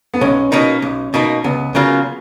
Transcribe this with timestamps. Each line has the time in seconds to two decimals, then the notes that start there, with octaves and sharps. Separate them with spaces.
0.14 B3
0.21 B1 C#4
0.52 B2 A#3 D#4
0.82 B1
1.14 B2 A#3 D#4
1.44 C#2 B3
1.75 C#3 F#3 A#3 F4